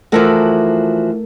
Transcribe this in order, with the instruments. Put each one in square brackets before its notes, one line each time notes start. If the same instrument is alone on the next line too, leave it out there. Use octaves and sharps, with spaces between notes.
[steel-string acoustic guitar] E3 F3 F#4 [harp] A3 A4 A#4